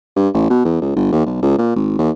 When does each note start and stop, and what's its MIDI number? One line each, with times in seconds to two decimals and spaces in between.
0.16 0.29 43
0.34 0.46 33
0.50 0.61 47
0.65 0.77 40
0.82 0.96 37
0.96 1.11 31
1.12 1.25 39
1.26 1.39 35
1.43 1.57 37
1.58 1.74 46
1.76 1.94 32
1.99 2.10 39